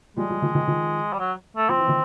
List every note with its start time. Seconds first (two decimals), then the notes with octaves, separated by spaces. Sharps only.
0.17 F3 G3 G#3
0.29 F3 G3
0.42 D#3 F3
0.55 D#3 F3
0.67 D#3 F3
1.13 G3
1.19 F#3
1.57 A3
1.69 F3 C4
1.78 E3
1.88 D#3 F3